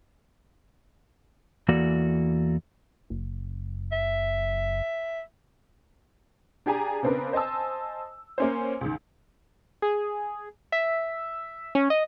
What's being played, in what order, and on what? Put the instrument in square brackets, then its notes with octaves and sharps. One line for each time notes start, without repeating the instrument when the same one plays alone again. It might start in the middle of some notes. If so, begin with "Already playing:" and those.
[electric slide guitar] E2 E3 A#3 F#4 A4 D5
[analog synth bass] F#1
[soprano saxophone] E5
[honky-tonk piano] D4 G4 G#4 G#5 A#5
C#3 B3 C4 D4 A#4 B4
C5 D#5 G#5 A5 E6
A#3 C#4 C5
C#2 D#3
[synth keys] G#4
E5
C#4
D#5